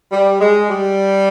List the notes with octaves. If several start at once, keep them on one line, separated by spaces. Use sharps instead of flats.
G3
G#3
G3